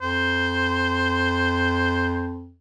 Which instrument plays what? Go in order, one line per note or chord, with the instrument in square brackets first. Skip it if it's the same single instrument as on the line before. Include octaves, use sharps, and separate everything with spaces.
[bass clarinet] F2 [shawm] C5